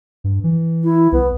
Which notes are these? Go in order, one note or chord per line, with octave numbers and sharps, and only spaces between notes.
G2
E3
E4
C2 B3